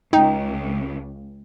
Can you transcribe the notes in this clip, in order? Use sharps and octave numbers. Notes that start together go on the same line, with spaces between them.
C#2 D#4 G5